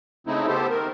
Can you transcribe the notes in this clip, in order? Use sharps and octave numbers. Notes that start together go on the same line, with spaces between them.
C#3 A3 C4 D#4 E4
B3 G4 A4 C5
D#3 A#4